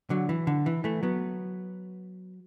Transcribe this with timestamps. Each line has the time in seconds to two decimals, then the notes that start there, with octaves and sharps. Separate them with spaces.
0.10 D3 F#3
0.29 E3
0.47 D3
0.66 E3
0.84 E3 A3
1.03 F#3 B3